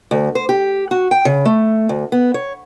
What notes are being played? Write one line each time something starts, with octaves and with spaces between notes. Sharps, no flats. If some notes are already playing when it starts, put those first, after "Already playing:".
D2
C5
G4
F#4
G5
C#3
A3
D2
B3
C#5